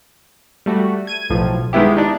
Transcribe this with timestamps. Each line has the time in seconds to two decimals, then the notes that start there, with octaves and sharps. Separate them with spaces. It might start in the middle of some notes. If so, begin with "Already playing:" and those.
0.66 G3 A3 F#4
1.07 G#6 D#7
1.30 B1 A2 F3
1.73 D#3 G#3 B3 E4 G4
1.97 D4 D#4